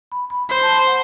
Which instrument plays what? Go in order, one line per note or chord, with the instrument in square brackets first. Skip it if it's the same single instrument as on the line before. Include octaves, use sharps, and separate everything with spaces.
[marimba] B5
B5
[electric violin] C5 [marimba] B5
[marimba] A5
B5
F#5